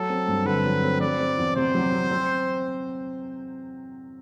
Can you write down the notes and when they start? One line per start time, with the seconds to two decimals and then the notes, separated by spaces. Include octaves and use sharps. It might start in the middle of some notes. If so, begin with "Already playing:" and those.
Already playing: F#3 A4
0.10 C4
0.28 G2
0.45 D3 B4
0.65 F#3
0.83 C4
1.01 F#3 D5
1.19 C4
1.37 E2
1.56 C3 C5
1.75 F#3
1.92 C4
2.11 C4